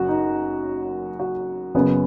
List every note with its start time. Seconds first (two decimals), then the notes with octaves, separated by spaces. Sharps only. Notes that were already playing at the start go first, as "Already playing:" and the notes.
Already playing: F#1 F#2 F#3 F#4
0.09 D#4
1.20 F#4
1.75 F#1 F#2 C#3 B3